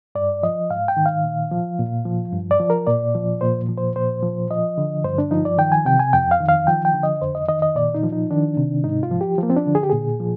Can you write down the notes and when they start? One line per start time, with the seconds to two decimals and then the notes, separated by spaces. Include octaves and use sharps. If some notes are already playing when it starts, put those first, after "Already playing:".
0.15 G2 D5
0.43 F3 D#5
0.70 G#2 F5
0.88 G5
0.97 D#3
1.06 F5
1.24 A#2
1.51 F3
1.79 A#2
2.05 F3
2.33 G2
2.51 D5
2.60 F3
2.70 A#4
2.87 A#2 D5
3.15 F3
3.41 A#2 C5
3.69 F3
3.78 C5
3.96 A#2 C5
4.23 F3
4.51 F3 D#5
4.78 D3
5.04 G2 C5
5.18 D4
5.31 F3 D#4
5.45 D5
5.58 D#3 G5
5.72 G#5
5.85 C3 G5
5.99 G#5
6.13 F2 G5
6.31 F5
6.41 D#3
6.49 F5
6.67 F3 G5
6.85 G5
6.94 D3
7.03 D#5
7.22 F2 C5
7.35 D#5
7.48 D#3 D#5
7.62 D#5
7.75 A#2 D5
7.94 D#4
8.03 F3
8.12 D#4
8.31 D#3 D4
8.57 C3
8.84 G#2 D#4
9.03 F4
9.11 F3
9.21 G4
9.38 F3 A#3
9.50 C4
9.56 D4
9.66 D3
9.75 G#4
9.83 G4
9.90 A#2 G#4
10.20 F3